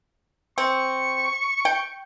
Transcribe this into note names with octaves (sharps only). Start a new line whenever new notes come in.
C4 C#6
G5